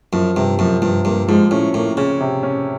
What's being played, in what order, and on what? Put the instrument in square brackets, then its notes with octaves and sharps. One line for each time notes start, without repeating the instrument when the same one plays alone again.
[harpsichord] F#2 [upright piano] F3
[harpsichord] G2 [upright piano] C3
[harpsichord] F#2 [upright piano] F3
[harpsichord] G2 [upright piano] F3
[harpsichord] G2 [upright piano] A#3
[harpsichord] G#2 [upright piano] F3
[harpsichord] A2 [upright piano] C#4
[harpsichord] A2 [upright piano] A#3
[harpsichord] C#3 [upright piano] C#4
[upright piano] C3
C#4